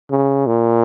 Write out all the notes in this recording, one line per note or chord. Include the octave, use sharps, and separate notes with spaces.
C#3
A#2